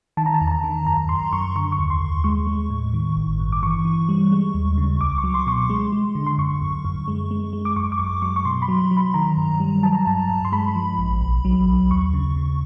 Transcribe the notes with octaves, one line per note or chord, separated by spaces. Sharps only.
D#3 A5
A#5
A5
E2
A#5
A5
D#3
F#2 A#5
F#2 C6
F#2 C#6
D3 C#6
C#6
D#2
C6
D#2
G#3 C#6
G#3
A2
D#3
G#1
G2
D6
E3 C#6
E3
G3
G#3
D#2
C#3
C#2 D6
C#6
F#3
C6
B2 C#6
C6
G#3
G#3
D3
C6
F#2 C#6
F#2
F#2
G#3
G#3
G#3
D6
F#2 C#6
D6
F#2 C#6
F#3 C#6
C#6
B2 C6
B5
F#3
F#3
B5
D#3 A#5
G2
G3
F#3 A5
A#5
G2 A5
G2
C6
G#3 B5
F3
A1
B1
F#3
B1
D#2 C#6
C#3
C#3